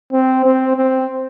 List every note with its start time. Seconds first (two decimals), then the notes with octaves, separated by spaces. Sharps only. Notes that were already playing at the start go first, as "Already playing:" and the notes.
0.13 C4
0.45 C4
0.77 C4